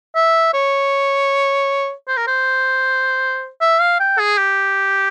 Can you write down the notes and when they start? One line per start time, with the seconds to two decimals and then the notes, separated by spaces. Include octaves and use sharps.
0.16 E5
0.54 C#5
2.08 C5
2.17 A#4
2.27 C5
3.61 E5
3.81 F5
4.00 G5
4.19 G#4
4.38 G4